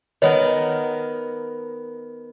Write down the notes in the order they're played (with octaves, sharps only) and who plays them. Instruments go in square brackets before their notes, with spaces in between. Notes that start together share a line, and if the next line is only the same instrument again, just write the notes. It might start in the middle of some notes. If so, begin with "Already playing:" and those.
[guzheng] D#3 B3 A#4 [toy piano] C#5 D#5